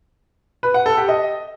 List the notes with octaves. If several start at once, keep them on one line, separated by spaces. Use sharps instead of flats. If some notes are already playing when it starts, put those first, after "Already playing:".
B4
F#5
A4
G4
D#5